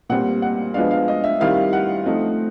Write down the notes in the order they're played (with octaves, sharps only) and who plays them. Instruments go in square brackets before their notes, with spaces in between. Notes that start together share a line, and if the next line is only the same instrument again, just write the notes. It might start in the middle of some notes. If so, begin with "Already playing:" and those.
[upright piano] A#2 G3 C4 F#5
F#5
F3 G#3 B3 D4 F5
F5
D#5
E5
D#3 G3 C4 E4 F5
F#5
F3 A3 C4 D#4